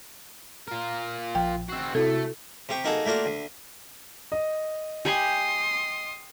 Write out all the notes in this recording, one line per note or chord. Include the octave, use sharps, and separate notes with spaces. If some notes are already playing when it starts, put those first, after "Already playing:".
F4 A#4
A#1 F3 G5
C4 F#4 E6 C7
C3 A3 E4 F#4 A4
C3 G4 C#6
A#3 D#4 F#4 G#4 A4
A3 A#3 D4 F4 F#4
D2
D#5
G4 G#5 B5 C6 D#6